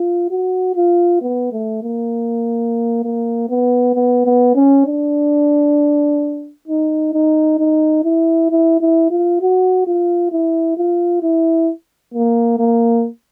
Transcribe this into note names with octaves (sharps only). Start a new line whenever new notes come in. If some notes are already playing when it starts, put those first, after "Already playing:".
Already playing: F4
F#4
F4
B3
A3
A#3
A#3
B3
B3
B3
C#4
D4
D#4
D#4
D#4
E4
E4
E4
F4
F#4
F4
E4
F4
E4
A#3
A#3